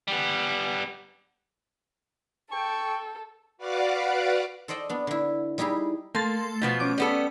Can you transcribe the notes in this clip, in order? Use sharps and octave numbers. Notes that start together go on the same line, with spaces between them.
G3 B3
A4 G5 C#6
F#4 B4 D5 F5 F#5 D6
A4 C5 D5 D#5 G5
B3 D4
D3 E4
G3 D#4 E4 G4 G#4
A3 A#3 C6 A6
B2 F3 B3
C#4 D6
G3 B3 A4